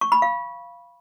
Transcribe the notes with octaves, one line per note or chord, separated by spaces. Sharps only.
C#6
B5
F5